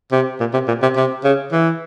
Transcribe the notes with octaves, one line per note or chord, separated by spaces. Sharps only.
C3
A#2
C3
A#2
C3
C3
C#3
E3